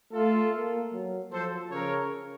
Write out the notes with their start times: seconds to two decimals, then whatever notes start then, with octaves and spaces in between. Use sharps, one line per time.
0.12 A3 F4 A4
0.53 A#3
0.93 F#3
1.32 F3 A4 C5
1.71 C#3 A#4 C#5